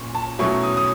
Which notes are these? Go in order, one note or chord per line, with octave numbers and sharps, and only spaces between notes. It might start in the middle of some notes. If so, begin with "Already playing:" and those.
Already playing: A#2 C#4
A5
B2 F#3 A3 C#4 E4 C#6
D#6
D#6